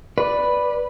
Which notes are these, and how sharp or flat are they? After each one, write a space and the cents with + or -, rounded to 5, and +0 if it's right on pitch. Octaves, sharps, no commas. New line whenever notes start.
B4 +0 D5 +0